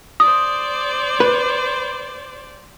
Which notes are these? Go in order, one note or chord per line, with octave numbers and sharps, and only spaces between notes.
C5 D5 D#6
B4